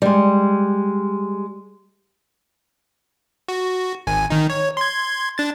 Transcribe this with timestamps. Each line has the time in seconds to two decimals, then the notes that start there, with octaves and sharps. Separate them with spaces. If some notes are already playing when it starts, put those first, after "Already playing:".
0.02 G3 G#3
3.48 F#4
4.07 G#1 G#5
4.30 D#3 D#4
4.50 C#5
4.77 C6 G#6
5.38 D4 A6